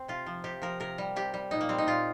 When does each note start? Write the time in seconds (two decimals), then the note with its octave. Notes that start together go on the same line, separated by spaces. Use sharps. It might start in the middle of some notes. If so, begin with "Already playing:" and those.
Already playing: C4
0.08 C3 F4
0.26 F3
0.44 C3 G4
0.62 F3 A#4
0.80 C3 A#4
0.98 G3
1.16 C3 G4
1.34 G3
1.51 A#2 D#4
1.61 A#3
1.69 G3 C4
1.78 D#4
1.87 A#2 F4